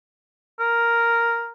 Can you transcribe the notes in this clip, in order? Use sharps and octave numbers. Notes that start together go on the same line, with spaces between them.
A#4